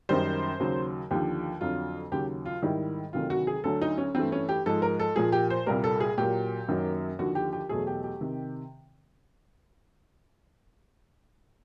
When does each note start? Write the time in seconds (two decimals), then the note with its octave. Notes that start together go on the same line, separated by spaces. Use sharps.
0.09 F#2 D#3 G3 C5
0.60 D#2 C#3 F#3
1.11 D#2 D3 F3 G4
1.61 F2 D3 F#3 F4
2.12 D#2 C#3 F#3 G4
2.45 F4
2.62 G#2 D#3 G3 E4
3.13 D2 C3 D#3 F#3 F4
3.30 F#4
3.47 G#4
3.64 D2 D3 F#3 A4
3.82 D#4
3.98 C#4
4.14 G2 E3 A3 C4
4.32 C#4
4.49 G4
4.66 G#2 F3 G#3 A4
4.82 A#4
5.00 A4
5.16 A#2 F3 A#3 G#4
5.32 G4
5.50 C5
5.66 C2 A#2 G3 A#3 A#4
5.84 A4
6.00 G#4
6.18 A#2 F#3 A#3 G4
6.68 F#2 D#3 F#3 A#3
7.19 D#2 D3 F3 F#4
7.35 G4
7.53 G4
7.69 E2 B2 F#3 A3 G#4
7.87 G4
8.04 G4
8.21 C3 D#3